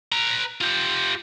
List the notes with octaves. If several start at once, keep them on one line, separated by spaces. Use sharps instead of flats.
B4 A#5
F4 G4